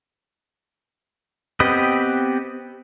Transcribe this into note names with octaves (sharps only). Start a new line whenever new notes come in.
B3 C4 G4 B4 D#5